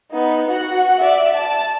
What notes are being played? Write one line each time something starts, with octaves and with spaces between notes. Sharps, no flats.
B3 D#4
F#4 F#5
D5 E5
A5